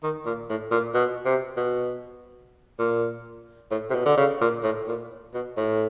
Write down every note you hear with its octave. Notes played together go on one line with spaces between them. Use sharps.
D#3
A#2
A2
A#2
B2
C3
B2
A#2
A2
C3
B2
D3
C#3
A#2
A2
A#2
B2
A2